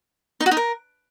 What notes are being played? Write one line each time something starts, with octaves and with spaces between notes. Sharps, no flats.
D#4
F#4
D#4
A#4